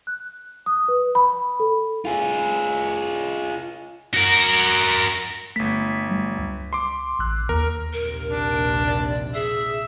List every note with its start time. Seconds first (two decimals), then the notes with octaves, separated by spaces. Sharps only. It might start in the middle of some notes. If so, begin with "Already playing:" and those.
0.07 F#6
0.66 D#6
0.88 B4
1.15 B5
1.60 A4
2.05 F4 G#4
4.14 F#4 A#4
5.56 G1 A3 B6
6.10 F#3 G3 A3
6.38 C#2
6.73 C6 D6
7.19 A1 E6 F#6
7.49 D#2 A#4
7.93 A#1 D#2 C3 A#4
8.30 D4
8.87 D5
9.34 G#4 E5